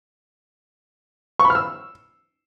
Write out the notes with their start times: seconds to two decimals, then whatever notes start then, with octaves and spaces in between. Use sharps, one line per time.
1.39 C#6
1.45 B5
1.50 F6
1.55 E6